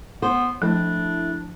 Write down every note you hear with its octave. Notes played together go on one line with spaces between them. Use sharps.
B3 C5
F3 A3 C4 D4 E4